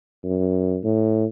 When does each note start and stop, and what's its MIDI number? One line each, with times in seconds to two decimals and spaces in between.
0.24 0.79 42
0.84 1.25 45